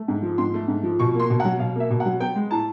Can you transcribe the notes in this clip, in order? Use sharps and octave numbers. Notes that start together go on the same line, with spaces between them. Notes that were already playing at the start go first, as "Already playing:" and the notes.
Already playing: A3
G#2
F3
G#2 C6
A3
G#2
F3
B2 C#6
A#3
C6
B2
F#5
F#3
B2 F5
A#3 E5
B2
F#5
F#3
B3 G5
G#3
A2 A5